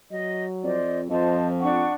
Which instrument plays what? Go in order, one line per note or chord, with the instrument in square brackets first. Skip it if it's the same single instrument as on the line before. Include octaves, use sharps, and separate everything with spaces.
[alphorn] F#3 [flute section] D#5
[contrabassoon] F2 [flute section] C5 D5 D#5
[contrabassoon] F2 [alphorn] F3 [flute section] C5 D#5 A5
[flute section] D4 F#5 C#6